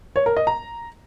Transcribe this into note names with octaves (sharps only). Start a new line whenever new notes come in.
C#5
A#4
D#5
A#5